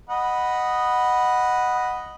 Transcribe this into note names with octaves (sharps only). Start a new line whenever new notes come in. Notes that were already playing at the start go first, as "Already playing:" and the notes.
D#5 F#5 B5